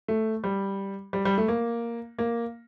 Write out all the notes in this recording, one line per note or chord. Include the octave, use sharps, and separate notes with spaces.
A3
G3
G3
G3
A3
A#3
A#3